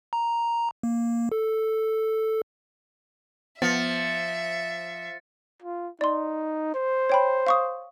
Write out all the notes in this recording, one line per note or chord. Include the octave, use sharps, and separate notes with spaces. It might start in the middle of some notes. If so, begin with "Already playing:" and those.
A#5
A#3
A4
F3 B3 E5 A6 C#7
F4
D#4 D5 C6
C5
C#5 G5 B5
F5 C#6 D#6